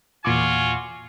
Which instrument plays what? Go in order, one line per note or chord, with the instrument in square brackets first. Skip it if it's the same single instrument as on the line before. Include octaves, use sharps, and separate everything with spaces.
[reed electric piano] E2 A#2 D6 [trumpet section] F4 F#4 G#5